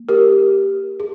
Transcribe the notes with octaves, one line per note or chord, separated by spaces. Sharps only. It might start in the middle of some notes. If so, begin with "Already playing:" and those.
Already playing: A#3
G4 A#4
G#4